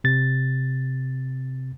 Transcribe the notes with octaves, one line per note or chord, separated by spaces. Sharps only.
C3 A6